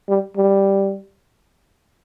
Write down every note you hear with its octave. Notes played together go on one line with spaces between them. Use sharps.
G3
G3